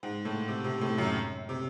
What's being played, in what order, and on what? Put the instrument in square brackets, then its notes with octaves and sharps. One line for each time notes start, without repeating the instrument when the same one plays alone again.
[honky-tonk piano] G#2
A2
C3
C3
A2
F#2
C3